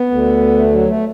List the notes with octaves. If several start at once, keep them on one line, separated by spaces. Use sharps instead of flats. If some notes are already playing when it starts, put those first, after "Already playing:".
Already playing: B3
D2 D3
A3
F#3
A3